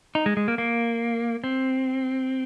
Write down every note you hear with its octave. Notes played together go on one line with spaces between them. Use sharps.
D#4
G#3
G#3
A#3
A#3
C4